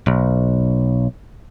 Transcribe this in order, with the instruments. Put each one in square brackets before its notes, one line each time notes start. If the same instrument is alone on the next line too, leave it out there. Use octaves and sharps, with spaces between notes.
[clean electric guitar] B1